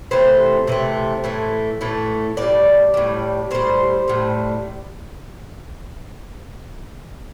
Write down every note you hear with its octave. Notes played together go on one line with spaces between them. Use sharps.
C3 E3 A3 C5
C3 E3 A3
A2 E3 A3
A2 E3 A3
A2 G3 D5
A2 G3
A2 G3 C5
A2 G3